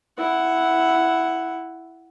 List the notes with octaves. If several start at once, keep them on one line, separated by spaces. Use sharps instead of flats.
E4 F#5